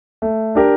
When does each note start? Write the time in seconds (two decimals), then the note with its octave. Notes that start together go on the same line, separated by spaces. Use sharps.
0.22 A3
0.55 D4 G4 A#4